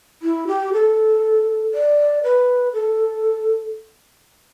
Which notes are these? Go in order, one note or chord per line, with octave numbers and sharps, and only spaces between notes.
E4
G4
A4
D5
B4
A4